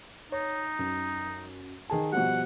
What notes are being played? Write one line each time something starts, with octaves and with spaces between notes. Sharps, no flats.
D#4 C#5
F#2
D#3 G#4 A5
B2 F3 G3 F#5